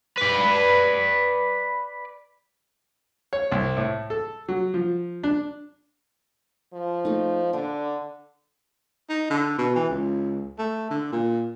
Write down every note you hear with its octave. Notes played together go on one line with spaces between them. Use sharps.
B4 D5
C#5
C2
A2
A4
F#3
F3
D4
F3
A3 D#4
D3 D4
D#4
D3
B2
E3
C#2
A3
D3
A#2